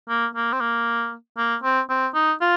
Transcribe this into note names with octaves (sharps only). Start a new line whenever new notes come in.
A#3
A#3
C4
A#3
A#3
C4
C4
D#4
F4